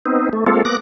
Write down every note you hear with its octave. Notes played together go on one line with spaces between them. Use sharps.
B3 C4 D#4
A3
G#3 A#3 C4 F4 A4
A#3 B3 D6 F#6 A#6